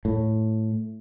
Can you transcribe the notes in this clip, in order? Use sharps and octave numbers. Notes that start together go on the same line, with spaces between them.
A2